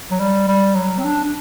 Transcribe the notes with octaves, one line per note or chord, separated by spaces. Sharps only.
F#3
G3
G3
F#3
C4
D4
D4